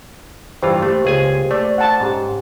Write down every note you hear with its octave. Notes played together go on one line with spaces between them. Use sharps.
G2 E3 F4 G4 C5
A3 A#3 G4
C#2 G#4 G#5
A3 D5
F#5 A5
G#2 C#4 G4